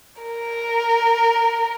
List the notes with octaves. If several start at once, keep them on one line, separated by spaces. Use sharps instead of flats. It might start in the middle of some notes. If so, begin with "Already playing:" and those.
A#4